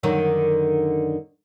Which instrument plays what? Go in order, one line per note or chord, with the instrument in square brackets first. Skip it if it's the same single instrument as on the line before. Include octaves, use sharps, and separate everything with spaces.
[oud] F#2 D3 D#3